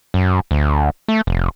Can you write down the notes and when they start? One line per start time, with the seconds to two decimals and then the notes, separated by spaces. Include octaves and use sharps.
0.14 F#2
0.51 D2
1.08 A3
1.27 F1